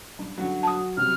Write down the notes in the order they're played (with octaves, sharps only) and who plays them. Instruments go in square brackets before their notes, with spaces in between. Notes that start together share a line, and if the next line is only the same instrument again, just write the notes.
[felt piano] G2
[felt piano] G2 D3 [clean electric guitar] F#3 F#4
[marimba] A5 D#6
[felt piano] C3 F#3 G3 [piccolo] F6